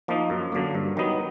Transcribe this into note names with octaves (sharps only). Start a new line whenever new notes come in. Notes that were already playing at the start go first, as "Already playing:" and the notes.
F3 A#3 D#4
F#2
D3 F#3 A#3
G2
D#3 F#3 B3 D#4